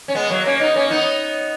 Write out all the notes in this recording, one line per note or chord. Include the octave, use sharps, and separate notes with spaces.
C#4
G#3 B3
F#3 A#3
A#3 C#4
B3 D#4
A#3 C#4
B3 D#4